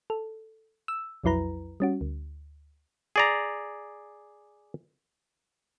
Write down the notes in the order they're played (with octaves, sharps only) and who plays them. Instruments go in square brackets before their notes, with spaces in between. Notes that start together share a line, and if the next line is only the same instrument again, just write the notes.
[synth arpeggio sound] A4
E6
B1 F2 F#3 E4 B4 A#5
G3 C#4 F#4
D2
[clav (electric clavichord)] G#4 D5 A#5